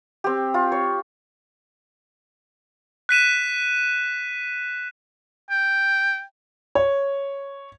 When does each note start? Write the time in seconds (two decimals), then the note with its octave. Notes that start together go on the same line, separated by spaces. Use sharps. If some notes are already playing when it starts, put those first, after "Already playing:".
0.24 C4 G4
0.54 F4
0.72 C#5
3.09 F#6 B6 D#7 E7
5.51 G5
6.75 C#5